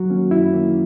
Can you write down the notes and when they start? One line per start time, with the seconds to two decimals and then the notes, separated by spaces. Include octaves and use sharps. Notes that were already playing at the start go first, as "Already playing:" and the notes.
Already playing: F#3 F#4
0.10 D#3 A#3 C#4
0.31 F#2 E4
0.53 D#3 A#3 C#4